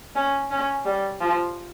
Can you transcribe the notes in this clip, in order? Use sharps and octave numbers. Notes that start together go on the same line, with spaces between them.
C#4
C#4
G3
F3